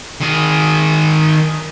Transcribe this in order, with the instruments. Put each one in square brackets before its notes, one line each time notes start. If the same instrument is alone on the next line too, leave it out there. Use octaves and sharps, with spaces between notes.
[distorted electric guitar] D#3 G#4